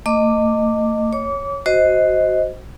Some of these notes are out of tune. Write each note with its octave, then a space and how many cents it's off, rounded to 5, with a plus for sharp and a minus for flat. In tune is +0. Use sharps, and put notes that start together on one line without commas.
A3 +45 D#5 -10 D6 +0
C#5 +0 D6 -30
F#4 +5 C5 +0 D#5 +15